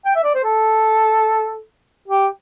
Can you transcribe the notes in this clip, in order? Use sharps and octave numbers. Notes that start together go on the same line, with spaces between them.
G5
E5
D5
C5
A4
G4